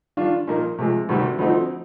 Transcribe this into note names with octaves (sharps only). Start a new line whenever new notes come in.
D#3 G3 D4 F4
A#2 F3 A#3 D#4 A#4
C3 F3 G#3
D2 C3 D#3 G3
D2 D3 F3 C4 D#4